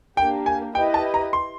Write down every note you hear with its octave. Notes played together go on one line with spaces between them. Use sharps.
A#3 D4 G4 G5
G#5
E4 G4 B4 D#5 G5
A5
A#5
C6